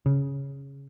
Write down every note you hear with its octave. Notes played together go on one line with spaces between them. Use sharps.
C#3